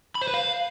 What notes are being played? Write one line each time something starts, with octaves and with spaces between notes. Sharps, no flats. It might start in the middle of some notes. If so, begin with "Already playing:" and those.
B5
C5
B4
F5